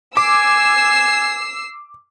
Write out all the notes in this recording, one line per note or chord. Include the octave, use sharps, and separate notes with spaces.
G#5 D6 E6 C7